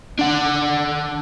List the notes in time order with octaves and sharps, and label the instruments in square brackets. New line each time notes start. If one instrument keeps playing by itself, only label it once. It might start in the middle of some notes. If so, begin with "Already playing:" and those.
[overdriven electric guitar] D4 F#5